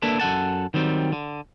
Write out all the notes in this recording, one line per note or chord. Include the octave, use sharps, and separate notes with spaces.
A#3 D4 E4 A4 B4
F#2 A4 F#5 A5
D#3 F#3 G3 C4
D3